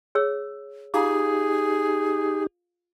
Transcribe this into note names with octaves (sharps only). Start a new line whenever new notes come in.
G#4 C#5 E6
D#4 F4 G4 G#4 F5